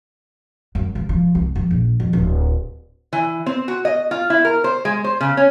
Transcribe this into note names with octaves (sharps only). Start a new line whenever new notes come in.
F#2
C3
F3
C2
F2
A#1
F2
D1
E3
C4
F#4
D#5
F4
E4
A#4
C5
G#3
C5
C#3
C#4